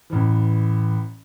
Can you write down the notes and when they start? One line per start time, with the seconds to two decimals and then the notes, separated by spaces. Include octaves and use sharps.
0.10 A1 E3